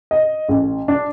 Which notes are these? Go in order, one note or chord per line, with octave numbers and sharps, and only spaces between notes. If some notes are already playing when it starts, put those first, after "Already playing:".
D#5
A1
D4